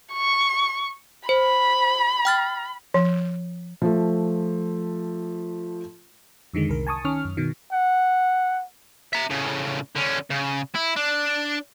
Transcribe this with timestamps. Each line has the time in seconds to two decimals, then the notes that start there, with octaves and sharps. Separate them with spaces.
0.13 C#6
1.29 C5 B5
2.25 G5 F6 A6
2.94 F3
3.82 F3 A3
6.53 F2 D3 D#3 G#3
6.69 C2 A#4
6.87 G#5 A5 C#6 D#6
7.04 D#3 C#4 C#6 F6
7.25 F#2
7.37 B2 D#3
7.72 F#5
9.13 E5 A#5
9.30 A2 C#3
9.96 D3 C#4
10.30 C#3
10.75 E4
10.96 D4